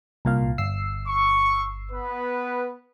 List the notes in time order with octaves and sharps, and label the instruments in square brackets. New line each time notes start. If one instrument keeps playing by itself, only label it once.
[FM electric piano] C2 A#2 F5
G1 E6 C7
[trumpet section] C#6
B3 B4